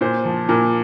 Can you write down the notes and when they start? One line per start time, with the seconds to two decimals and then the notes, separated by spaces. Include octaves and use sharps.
0.01 A#2 C5
0.25 F3
0.49 A#2 A#4